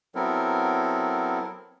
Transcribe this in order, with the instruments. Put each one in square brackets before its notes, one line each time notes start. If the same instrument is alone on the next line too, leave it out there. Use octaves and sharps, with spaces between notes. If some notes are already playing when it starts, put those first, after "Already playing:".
[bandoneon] F#3 B3 C4 E4 A4 A#4